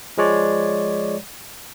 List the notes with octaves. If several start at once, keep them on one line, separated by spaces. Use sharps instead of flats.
F3 G#3 C#5 D5